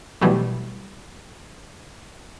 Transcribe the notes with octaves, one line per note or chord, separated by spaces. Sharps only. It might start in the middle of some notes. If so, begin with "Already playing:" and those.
B2 E3 F#3 G3 A3